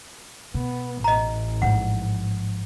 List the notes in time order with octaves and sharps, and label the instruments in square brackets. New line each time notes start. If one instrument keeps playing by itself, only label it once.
[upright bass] B2 [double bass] B3
[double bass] A1 [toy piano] D#5 A#5
[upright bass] G#2 F3 [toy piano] F#5